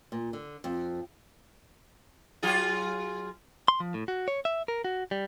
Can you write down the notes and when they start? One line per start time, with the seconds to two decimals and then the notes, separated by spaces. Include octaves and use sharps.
0.12 A#2
0.33 D3
0.64 F2
2.43 F#3 F4 G#4
3.68 C6
3.80 F3
3.94 A2
4.08 F#4
4.28 C#5
4.45 E5
4.68 A#4
4.85 F#4
5.11 G3